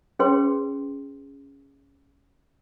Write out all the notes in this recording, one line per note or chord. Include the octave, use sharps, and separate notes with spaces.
C#4 G#4 B4 C#5 G5 C6